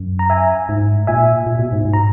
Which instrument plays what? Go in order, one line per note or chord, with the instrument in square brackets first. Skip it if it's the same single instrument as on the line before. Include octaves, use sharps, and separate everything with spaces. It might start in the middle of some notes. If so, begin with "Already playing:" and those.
Already playing: [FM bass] F#2
[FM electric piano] A#5
E5 G#5
[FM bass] G#2
[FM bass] A#2 [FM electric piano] E5 G#5
[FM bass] A#2
B2
G#2
G#2
[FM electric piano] A#5